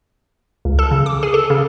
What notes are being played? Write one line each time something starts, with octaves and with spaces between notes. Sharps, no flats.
C#2
A4
C#3
D6
G#4
A4
C#3